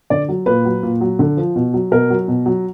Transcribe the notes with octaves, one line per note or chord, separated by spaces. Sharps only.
D3 D5
F#3
A#2 B4
F#3
A#2
F#3
D3
F3
B2
F#3
B2 A#4
F#3
B2
F#3